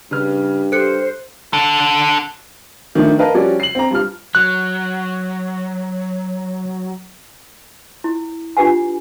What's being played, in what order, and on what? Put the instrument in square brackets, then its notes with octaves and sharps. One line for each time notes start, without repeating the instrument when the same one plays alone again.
[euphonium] G2 [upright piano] C#3 B4 F6
[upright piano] G4 [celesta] A4 F#6 C#7 [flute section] C5
[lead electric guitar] D3 A4
[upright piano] D#3 F3 A3 D4
A#4 B4 D#5 F5 A5
F3 G3 C#4 F#4 D5
C7 F#7
C4 A#5
G2 F4 F6
[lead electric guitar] F#3 [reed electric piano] F#6
[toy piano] E4
D4 F4 G4 B4 F#5 G#5